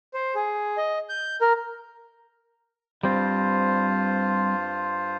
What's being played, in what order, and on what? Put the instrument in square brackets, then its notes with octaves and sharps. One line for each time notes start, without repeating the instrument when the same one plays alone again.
[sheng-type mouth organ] C5
G#4
D#5
G6
A#4
[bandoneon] G2 F4 C5 [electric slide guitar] G3 C4